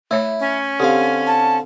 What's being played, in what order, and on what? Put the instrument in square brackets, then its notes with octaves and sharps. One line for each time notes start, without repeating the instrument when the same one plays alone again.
[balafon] A3 C#5 E5 [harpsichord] E4
[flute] C#4
[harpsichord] D3 C4 F5 [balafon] G4
[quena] A5